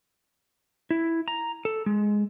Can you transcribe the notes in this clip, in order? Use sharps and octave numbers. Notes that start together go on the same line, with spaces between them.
E4
A#5
A4
G#3